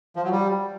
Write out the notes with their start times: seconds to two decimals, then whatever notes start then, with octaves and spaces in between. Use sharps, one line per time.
0.16 F3
0.24 F#3
0.32 G3